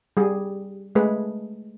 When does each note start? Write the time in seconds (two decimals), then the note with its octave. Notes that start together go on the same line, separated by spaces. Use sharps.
0.17 G3 G#4
0.95 G#3 A3 G#4 B4